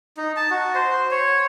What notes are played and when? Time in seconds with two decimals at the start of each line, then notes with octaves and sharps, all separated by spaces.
0.17 D#4
0.36 A5
0.50 F#4
0.75 C5
1.11 C#5